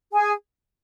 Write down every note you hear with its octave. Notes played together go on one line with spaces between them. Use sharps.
G#4 G#5